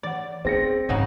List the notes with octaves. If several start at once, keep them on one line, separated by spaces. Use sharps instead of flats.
E3 C#5 D5 F#5
B3 C4 G#4 A#6 C#7
A1 G#2 C#3 F#3 D#4